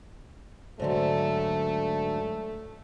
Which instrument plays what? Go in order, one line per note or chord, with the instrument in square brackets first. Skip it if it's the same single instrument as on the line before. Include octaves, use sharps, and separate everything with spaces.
[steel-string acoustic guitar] G#2 D3 F#3 [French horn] A3